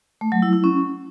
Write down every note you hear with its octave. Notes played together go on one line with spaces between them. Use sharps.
A3
F#3
E4
E4
C#4